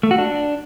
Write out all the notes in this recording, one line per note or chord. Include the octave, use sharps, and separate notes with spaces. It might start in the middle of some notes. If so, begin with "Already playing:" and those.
A3
F#4
D4